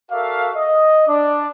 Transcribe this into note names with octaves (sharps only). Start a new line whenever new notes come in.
F#4 A4 A#4 D5 E5 F5
D#5
D4 D5